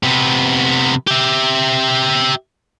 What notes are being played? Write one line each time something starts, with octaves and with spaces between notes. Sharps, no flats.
C3 B3
G4 E5